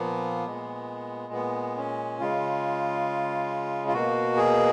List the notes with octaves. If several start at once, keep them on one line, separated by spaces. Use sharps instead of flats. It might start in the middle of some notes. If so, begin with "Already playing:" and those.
Already playing: A#2 F3 A#3 B3
A#2 G#3
B3
C#4
C#3 G#3 F4
F4
B2 A#3 F#4
G#4